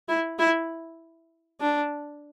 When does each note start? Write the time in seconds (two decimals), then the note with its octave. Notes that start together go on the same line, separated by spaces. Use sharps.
0.09 E4
0.39 E4
1.60 D4